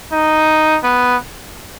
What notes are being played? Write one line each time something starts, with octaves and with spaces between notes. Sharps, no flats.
D#4
B3